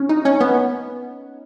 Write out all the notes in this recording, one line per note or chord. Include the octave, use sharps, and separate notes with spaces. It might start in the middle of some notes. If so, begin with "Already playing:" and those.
Already playing: C#4
D#4
C#4
B3